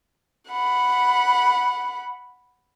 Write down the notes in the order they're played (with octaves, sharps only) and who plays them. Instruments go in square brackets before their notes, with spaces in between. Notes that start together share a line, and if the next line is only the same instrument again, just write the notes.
[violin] F#5 B5